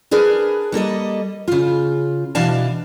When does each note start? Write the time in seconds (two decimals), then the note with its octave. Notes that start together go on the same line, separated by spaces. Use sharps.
0.11 D4 G#4 A#4 B4
0.72 G3 A#3 A4 D#5
1.48 C#3 F4
2.35 B2 E3 D4 F5 A5